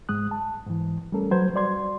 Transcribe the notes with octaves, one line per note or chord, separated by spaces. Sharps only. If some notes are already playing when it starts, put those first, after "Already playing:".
G#2 G#3 D#6 F#6
A5
G#2 E3
G3 A3 C#4 A4 A#4
F#3 B4 C5 G6 G#6
G3 F#4 D5 C6 G#6